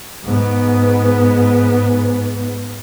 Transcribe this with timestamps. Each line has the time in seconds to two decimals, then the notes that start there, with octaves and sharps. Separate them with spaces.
0.25 G#2 B3